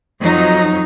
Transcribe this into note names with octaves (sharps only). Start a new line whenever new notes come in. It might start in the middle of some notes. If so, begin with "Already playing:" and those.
F2 F#3 D#4